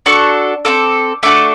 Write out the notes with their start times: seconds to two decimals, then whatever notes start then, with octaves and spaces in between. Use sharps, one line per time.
0.06 D4 F#4 A4 C#6
0.65 C4 F4 A4 D6
1.23 A3 D4 F#4 A4 D6